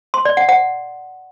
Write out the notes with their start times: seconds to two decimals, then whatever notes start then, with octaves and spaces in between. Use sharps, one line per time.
0.14 C6
0.25 D5
0.37 F#5
0.49 F#5